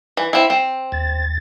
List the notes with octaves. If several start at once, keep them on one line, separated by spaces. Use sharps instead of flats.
E3
C4 E4
C4
D#2 A6